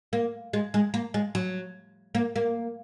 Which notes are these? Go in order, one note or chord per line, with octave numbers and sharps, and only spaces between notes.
A#3
G#3
G#3
A#3
G#3
F#3
A#3
A#3